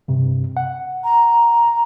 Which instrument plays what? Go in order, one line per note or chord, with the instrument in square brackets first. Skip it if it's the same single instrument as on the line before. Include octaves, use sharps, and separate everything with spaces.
[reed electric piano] G2 C3
F#5
[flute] A#5